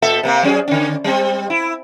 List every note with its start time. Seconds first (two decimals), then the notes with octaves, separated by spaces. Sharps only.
0.02 A#2 A4 E5
0.23 C3 A#3 C4
0.43 F#3 C#4 G#4
0.68 D3 C#4
1.04 G3 C4
1.50 E4